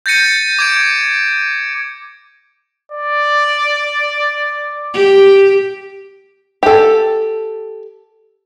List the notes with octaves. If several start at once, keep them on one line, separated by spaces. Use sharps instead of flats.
G6 A6 A#6 C#7 D#7
D6 G#6 D7
D5
G4
G4 A4